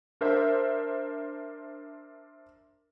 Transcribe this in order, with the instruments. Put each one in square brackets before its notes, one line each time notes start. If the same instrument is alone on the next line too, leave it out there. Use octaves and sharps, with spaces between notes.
[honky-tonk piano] D4 A#4 C5 E5